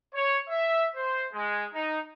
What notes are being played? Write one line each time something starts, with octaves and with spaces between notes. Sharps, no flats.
C#5
E5
C5
G#3
D#4